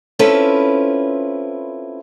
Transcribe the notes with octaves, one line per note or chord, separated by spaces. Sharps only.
C4 C#4 E4 F4 A4 B4